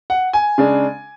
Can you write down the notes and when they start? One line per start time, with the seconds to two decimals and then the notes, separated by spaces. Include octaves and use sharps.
0.10 F#5
0.33 G#5
0.58 C#3 G#3 D4